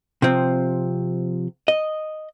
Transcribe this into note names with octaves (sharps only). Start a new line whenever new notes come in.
C3 F3 C4
D#5